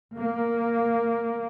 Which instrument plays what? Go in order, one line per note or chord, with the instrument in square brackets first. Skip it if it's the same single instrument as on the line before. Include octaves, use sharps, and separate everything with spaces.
[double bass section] A#3